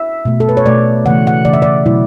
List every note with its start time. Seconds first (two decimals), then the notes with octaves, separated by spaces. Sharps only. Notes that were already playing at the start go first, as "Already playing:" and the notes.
Already playing: E5
0.25 B2 A3
0.40 A4
0.49 B4
0.57 C#5
0.65 B2 A3 D5
1.06 C#3 E3 A3 F#5
1.27 F#5
1.45 C#3 E3 A3 D5
1.53 E5
1.62 D5
1.86 B2 F#3 A3 E4